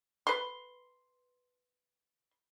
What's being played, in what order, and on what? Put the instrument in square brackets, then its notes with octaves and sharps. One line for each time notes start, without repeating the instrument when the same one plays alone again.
[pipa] B4 C6